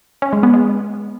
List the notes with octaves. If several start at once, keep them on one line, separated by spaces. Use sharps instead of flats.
C#4
G#3
B3
G#3